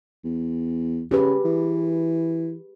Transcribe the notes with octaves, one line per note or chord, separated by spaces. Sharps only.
E2
C#3 G4 G#4 B4
E3